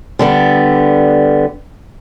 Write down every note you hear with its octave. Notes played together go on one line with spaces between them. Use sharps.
D3 G3 B3